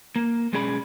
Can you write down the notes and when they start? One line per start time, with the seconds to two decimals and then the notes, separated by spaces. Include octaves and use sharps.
0.16 A#3
0.53 B1 G#3 C#4 G#4 D5 B5